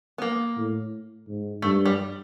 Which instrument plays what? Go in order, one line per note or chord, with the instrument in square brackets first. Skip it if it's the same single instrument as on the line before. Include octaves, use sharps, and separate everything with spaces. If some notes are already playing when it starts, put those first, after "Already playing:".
[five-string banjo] B3
A#3
[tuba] A2
G#2
[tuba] G2 [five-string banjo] A3
[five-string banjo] G3